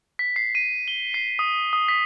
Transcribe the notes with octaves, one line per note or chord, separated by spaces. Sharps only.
B6
C7
D#7
G7
C7
D#6
D#6
B6